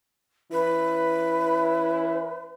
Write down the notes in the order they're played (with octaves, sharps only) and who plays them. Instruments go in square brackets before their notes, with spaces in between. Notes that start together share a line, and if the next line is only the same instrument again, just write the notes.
[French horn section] E3 C#4 E4 [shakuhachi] B4